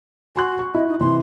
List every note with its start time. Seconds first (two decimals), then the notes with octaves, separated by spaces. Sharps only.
0.36 F#4 G#5 C6 F#6
0.59 C#6
0.75 E4 D#5
0.88 D#4
1.00 C3 E3 C6